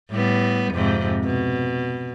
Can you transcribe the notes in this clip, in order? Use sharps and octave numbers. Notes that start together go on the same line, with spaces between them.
A2 G3 B3
F2 G#2 C3
B2